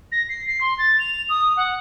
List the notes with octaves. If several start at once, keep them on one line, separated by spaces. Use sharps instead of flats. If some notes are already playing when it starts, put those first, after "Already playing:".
A#6
C7
C7
C6
A6
F7
D#6
F#5